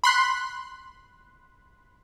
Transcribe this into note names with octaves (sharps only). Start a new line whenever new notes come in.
B5 C6 F#6